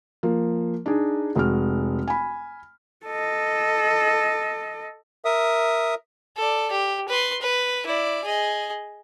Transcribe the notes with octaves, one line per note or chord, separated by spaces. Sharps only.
F3 A#3
D4 D#4 G#4
F1 G#3 F#4 F6
G#5 B5
A4 D#5
A#4 E5 D#6
A4 D5
G4
B4 C6
B4
E4 D5
G#4 D#5